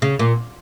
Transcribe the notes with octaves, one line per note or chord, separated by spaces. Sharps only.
C#3
A#2